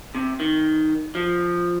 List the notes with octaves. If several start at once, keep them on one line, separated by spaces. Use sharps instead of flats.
C3
D#3
F3